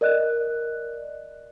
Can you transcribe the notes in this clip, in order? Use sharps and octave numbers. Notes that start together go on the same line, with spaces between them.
A#4 D5 D#5 F#6